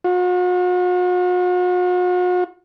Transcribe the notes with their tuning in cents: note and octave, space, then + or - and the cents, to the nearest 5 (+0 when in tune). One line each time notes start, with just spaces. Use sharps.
F#4 -45